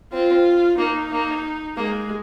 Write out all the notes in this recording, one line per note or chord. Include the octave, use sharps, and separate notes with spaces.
C4 F4
A#3 D#4
A#3
G#3 A#3